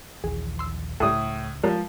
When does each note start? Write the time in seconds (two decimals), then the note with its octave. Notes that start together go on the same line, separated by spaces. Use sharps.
0.24 A#1 D#2 E3 G#4
0.59 C6 E6
1.00 C#2 A2 G3 A4 D#6
1.64 F3 G3 G#3 A#4